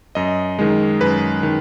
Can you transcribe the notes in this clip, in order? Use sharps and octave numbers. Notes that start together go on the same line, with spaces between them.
F#2 D#5
D#3 G#3
F#2 B4
D#3